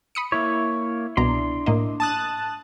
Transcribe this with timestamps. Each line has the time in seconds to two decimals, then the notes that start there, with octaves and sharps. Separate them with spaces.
0.15 B5 D#6 C#7
0.32 A#3 E4 C#5
1.17 C2 B2 D4 A#5 C6
1.66 A2 A#3 D#5
2.00 A5 D#6 F#6